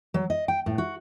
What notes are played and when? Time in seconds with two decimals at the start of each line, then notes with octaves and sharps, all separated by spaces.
0.14 F#3
0.30 D#5
0.48 G5
0.66 A2
0.78 F#4